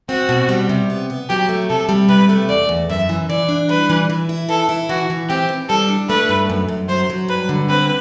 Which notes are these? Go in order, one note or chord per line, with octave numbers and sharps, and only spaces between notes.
C4 F#4
B2
G3
C3
B3
B3
F#3 G4
A3
C3 A4
G3
C3 B4
A3
E2 D5
E2
F#2 E5
E3
E3 D5
D4
G3 B4
E3
E3
E4
E3 A4
E4
E3 F#4
E3
C4 G4
E3
G3 A4
D4
A3 B4
G2
F#2
F#2
F#3 C5
F#3
G2 B4
D3
C4 B4